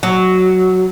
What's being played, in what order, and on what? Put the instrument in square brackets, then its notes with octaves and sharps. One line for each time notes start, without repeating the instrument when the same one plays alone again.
[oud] F#3